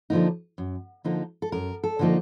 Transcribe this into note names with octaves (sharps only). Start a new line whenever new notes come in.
D3 F3 A#3 D#4
F#2
D3 F3 A#3 D#4
A4
F#2 A#4
A4
D3 F3 A#3 D#4